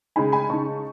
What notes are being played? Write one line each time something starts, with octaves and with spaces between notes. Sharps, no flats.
C#3 G#3 D#4 G#5 B5
G#5 B5
C#3 G#3 D#4 A5 C#6